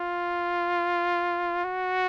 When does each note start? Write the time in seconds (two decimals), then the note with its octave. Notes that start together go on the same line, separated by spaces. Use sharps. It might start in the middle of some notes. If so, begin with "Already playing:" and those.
Already playing: F4
1.65 F#4